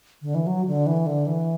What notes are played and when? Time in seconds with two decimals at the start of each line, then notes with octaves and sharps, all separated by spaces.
0.22 D3
0.34 E3
0.47 F#3
0.66 D3
0.86 E3
1.06 D3
1.26 E3